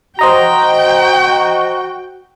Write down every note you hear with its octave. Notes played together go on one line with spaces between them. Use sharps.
F#4 C5 D#5 G5 A#5